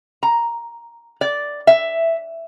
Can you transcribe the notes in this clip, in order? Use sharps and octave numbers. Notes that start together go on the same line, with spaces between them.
A#5
D5
E5